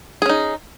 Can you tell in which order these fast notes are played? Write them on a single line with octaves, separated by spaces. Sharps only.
G#4 C#4 D#4